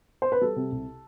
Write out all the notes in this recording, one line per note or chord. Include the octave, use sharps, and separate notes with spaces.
C5
B4
G3 A4
C3
C2